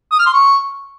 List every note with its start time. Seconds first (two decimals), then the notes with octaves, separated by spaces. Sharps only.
0.12 D#6
0.19 F6
0.27 C6
0.34 C#6